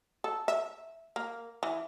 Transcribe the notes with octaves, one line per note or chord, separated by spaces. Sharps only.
A4
E5
A#3
E3